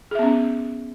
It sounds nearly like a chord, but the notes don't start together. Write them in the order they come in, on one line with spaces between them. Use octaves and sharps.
G#4 E5 B3 C#4